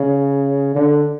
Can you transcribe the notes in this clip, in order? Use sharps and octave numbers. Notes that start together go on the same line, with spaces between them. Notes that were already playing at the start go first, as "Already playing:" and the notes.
Already playing: C#3
D3